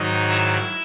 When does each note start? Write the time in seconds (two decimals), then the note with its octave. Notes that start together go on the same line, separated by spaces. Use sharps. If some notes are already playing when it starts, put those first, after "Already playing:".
Already playing: G#2 D#3 F#3 D#4 D#5
0.30 E4 E5